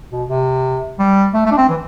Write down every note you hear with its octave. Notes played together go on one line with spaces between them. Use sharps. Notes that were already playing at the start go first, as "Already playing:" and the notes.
B2
C3
G3
A3
A3
D4
C4
E3